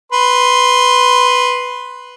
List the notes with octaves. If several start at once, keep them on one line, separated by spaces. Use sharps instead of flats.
B4 C6